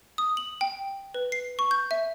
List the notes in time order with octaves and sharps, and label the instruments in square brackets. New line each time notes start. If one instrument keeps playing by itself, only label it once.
[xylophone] D#6
F#7
G5
B4
C7
C#6
G6
E5